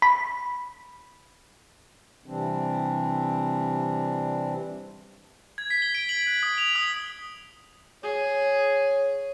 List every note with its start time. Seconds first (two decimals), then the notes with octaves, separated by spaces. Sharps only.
0.02 B5
2.26 C3 E3 G3 C4 D4
5.58 G#6
5.70 B6
5.82 G7
5.95 D7
6.09 F#7
6.27 F#6
6.43 D#6
6.58 F7
6.76 D#6
8.03 G#4 C#5